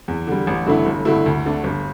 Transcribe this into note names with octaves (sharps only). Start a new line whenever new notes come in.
E2
D3 G3
A1
G2 D3 A3 E4
G1
G2 D3 A3 E4
D2
D3 A3 D4
G1